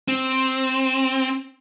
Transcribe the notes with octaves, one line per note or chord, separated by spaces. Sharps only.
C4